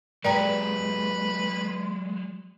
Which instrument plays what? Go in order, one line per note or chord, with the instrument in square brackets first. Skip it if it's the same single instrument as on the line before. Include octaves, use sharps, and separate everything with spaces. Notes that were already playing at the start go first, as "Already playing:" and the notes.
[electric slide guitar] F#3 G#3 [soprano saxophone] B4 [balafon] D5 G5 A#5